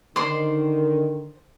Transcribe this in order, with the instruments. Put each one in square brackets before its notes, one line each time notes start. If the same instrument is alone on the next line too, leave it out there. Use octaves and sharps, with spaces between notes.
[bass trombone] D3 [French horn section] D#3 [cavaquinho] C5 D5 C6